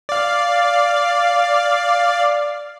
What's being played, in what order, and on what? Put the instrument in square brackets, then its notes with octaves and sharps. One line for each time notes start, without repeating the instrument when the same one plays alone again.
[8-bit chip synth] D5 F5